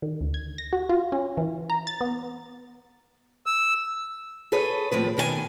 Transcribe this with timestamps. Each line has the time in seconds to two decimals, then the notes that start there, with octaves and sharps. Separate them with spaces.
0.02 D#3
0.21 D2
0.34 G#6
0.58 A#6
0.73 F#4
0.89 F4
1.12 C#4
1.37 E3
1.70 A#5
1.87 A6
2.01 B3
3.46 E6
4.52 G#4 A4 B4 C#5
4.92 D#2 A2 F3 B4
5.17 B2 D#3 C5 G#5